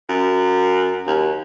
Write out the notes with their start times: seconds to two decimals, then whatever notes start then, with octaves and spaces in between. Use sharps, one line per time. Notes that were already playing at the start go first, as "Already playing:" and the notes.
0.09 F#2
1.06 D#2